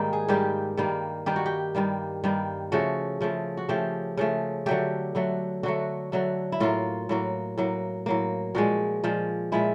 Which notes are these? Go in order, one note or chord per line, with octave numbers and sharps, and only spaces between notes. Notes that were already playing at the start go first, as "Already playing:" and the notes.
Already playing: G#2 D#3 G3 A#3 D#4
G#4
G#2 D#3 G3 A#3 G4
G2 D#3 G3 A#3
G2 D#3 G3 A#3 G4
F#4
G4
G2 D#3 G3 A#3
G2 D#3 G3 A#3
C#3 F3 A3 F#4
C#3 F3 A3
F#4
C#3 F3 A3 G4
C#3 F3 A3
D3 F#3 A3 G4
D3 F#3 A3
D3 F#3 A3 F#4
D3 F#3 A3
E4
A2 F#3 A#3 F4
A2 F#3 A#3
A2 F#3 A#3
A2 F#3 A#3
A#2 F3 G#3 F#4
A#2 F3 G#3
A#2 F3 G#3 E4